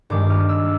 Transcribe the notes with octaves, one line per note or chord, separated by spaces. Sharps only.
G2 D#3 G#3 D6
F6
E6